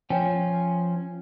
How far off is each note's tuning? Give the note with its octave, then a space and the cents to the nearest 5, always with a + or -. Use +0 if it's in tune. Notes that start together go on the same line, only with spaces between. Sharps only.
F3 +0 C#4 +0 G5 +0